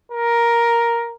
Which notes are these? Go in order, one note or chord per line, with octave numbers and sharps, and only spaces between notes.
A#4